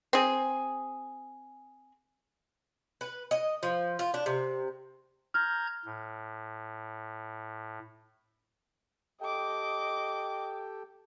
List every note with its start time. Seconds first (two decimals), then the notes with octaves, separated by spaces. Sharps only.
0.13 C4 G#4
3.01 B4
3.31 D#5
3.63 F3
3.99 F4
4.14 D4
4.26 C3
5.34 A#5 F6 G6 G#6
5.86 A2
9.21 G4 A4 D#5 G5 D6